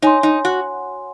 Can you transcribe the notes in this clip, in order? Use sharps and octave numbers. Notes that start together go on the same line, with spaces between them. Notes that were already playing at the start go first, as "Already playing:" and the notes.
D#4 C#5 G#5 C6
D#4
F#4